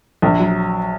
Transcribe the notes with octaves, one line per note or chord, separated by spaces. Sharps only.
A#1
F#3